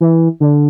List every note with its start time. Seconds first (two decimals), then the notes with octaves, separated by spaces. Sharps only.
0.01 E3
0.40 D3